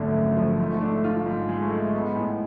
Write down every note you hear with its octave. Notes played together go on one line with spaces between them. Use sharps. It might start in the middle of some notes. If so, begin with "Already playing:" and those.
Already playing: G#1 F#2 D3 F3 A3
F#2
F3
G#2 A3
D4
F4
G#2
G#3
A3
G#3
G#3 B3
A2